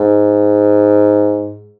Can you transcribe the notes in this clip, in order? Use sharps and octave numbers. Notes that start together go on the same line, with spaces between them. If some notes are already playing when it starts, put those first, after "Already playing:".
Already playing: G#2